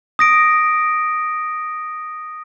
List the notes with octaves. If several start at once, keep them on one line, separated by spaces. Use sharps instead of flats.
D#6 A#6 D7